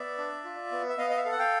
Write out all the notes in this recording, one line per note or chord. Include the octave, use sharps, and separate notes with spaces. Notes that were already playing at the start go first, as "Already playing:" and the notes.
Already playing: B3 D5 E5
D4
F4
B3
E5
B3 D#5 F5
D#5
E5
A4 F5
F#5
F5 G5